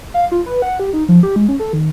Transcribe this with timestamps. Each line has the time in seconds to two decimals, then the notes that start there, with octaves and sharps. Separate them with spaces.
0.14 F5
0.32 F4
0.46 B4
0.62 F#5
0.80 G4
0.93 D#4
1.09 F3
1.23 G4
1.36 G#3
1.49 C#4
1.60 A4
1.73 D#3